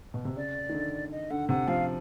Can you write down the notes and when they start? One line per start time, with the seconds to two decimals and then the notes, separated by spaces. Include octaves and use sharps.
0.14 B2
0.25 C3
0.36 C#3 D5
0.69 D#3
0.74 D3
1.11 D#5
1.30 D3 F#5
1.48 C3 F#5
1.67 F3 F5